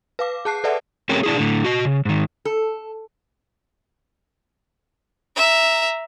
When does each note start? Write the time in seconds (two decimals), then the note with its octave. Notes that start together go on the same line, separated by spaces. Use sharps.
0.19 B4 F5 D6
0.45 G#4 A5 F#6 C7
0.64 A4 B4 D5 E5 F#5 A5
1.09 A3 C4 C#4 G4 G#4 A#4
1.23 D4 E4 G#4
1.37 A2 D3
1.64 F#4 D#5
1.85 C#3
2.05 G#2 D#3
2.45 A4
5.36 E5 A#5